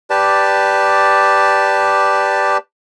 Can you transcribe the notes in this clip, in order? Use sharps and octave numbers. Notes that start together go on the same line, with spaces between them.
G4 B4 D5 A5